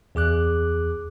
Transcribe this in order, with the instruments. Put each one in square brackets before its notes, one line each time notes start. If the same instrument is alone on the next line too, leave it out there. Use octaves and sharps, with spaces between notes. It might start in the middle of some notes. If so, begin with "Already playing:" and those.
[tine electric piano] E2 G#4 D6 F#6